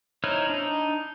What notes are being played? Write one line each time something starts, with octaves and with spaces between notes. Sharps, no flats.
D#4 E4 C5 C#5 F6
D4 D#4